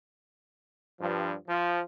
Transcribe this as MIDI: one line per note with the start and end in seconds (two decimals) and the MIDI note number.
1.00 1.33 43
1.00 1.33 53
1.49 1.81 53